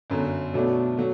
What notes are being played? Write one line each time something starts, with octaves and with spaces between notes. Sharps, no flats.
G1 F#2 D3
B1 B2 F#3 A3 D4
F#3 A3